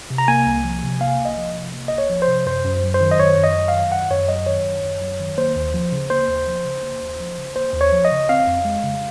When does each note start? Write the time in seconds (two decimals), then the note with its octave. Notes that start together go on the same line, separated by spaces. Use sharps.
0.10 C3
0.18 A#5
0.28 A#3 G#5
0.46 C2
0.64 F3
0.83 C3
1.01 A#3 F5
1.19 C2
1.25 D#5
1.37 F3
1.55 C3
1.73 A#3
1.88 C2 D#5
1.98 C#5
2.10 F3
2.22 C5
2.28 C3
2.46 F#2 C5
2.65 F#2
2.83 F#3
2.94 C5
3.01 D#3
3.11 D#5
3.19 F#2 C#5
3.37 F#2
3.44 D#5
3.55 F#3
3.68 D#3 F5
3.91 F#2 F#5
4.10 F#2 C#5
4.28 F#3 D#5
4.46 D#3 C#5
4.65 F#2
4.83 F#2
5.01 F#3
5.20 D#3
5.38 A#3 C5
5.56 D#2
5.74 F3
5.92 C#3
6.10 A#3 C5
6.28 D#2
6.47 F3
6.65 C#3
6.83 A#3
7.02 D#2
7.20 F3
7.38 C#3
7.56 A#3 C5
7.74 D#2
7.81 C#5
7.92 F3
8.05 D#5
8.11 C#3
8.29 C4 F5
8.47 F2
8.65 G#3
8.83 C#3